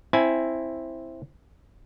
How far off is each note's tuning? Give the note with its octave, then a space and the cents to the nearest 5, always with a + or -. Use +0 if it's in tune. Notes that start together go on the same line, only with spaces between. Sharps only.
C4 +10 E4 +0 G#5 +20